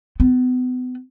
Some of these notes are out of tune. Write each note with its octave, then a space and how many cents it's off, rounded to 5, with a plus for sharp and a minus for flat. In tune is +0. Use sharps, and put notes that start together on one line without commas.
B3 +35